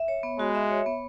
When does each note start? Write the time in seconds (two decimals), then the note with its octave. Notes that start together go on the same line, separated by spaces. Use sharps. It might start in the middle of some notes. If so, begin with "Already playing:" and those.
Already playing: E5
0.08 C#5
0.23 B3
0.39 G#3 F#4
0.55 E5
0.70 C#5
0.86 B3